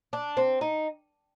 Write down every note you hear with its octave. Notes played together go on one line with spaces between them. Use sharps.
D4
C4
D#4